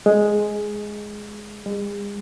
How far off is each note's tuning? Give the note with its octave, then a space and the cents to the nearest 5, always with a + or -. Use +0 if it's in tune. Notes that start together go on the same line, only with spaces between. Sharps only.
G#3 +5
G#3 -40